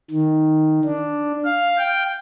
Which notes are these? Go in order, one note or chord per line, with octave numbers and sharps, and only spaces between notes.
D#3
D4
F5
G5